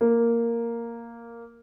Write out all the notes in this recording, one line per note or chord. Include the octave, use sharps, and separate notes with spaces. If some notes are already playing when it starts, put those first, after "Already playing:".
A#3